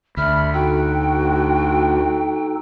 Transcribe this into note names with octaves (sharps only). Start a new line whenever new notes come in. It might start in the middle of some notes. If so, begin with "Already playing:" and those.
D2 E5 B5 F6
D#4 F#4 A4 G5